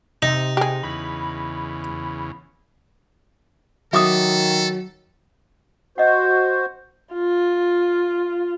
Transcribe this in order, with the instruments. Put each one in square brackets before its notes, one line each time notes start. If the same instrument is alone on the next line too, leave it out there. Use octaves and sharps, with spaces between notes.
[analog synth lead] C3 [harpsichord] D#4
[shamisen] G4 G#4
[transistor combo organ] E2 C#3 [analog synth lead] B5
[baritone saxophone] D#3 [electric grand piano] F#3 [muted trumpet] A4 [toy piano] E5 D6 D#6
[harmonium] F#4 C5 [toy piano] D#5 F#5
[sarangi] F4